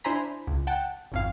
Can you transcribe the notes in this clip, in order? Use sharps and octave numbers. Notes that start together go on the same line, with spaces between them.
D4 E4 C5 G#5 A#5 B5
C#2
F#5 G5 A5
G#1 F2 F5